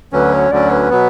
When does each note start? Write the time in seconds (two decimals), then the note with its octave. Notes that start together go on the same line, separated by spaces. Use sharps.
0.12 D2 D3 F#3 C#4 B4
0.32 C#5
0.51 D2 D3 F#3 C#4 D5
0.70 B4
0.90 B2 F#3 B3